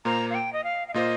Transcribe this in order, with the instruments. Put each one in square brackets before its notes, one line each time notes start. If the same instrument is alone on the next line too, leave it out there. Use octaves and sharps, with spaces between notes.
[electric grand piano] A#2 A#3 F4 C5 [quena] A#5
[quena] F5
G5
D#5
F5
F5
[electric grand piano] A#2 A#3 F4 C5 [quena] D#5